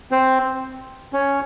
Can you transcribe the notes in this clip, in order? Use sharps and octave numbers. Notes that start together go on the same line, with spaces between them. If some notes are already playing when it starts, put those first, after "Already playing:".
C4 C5
C#4 C#5